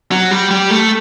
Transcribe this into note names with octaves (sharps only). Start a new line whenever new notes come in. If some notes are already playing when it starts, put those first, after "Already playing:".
F#3
G3
G3
A3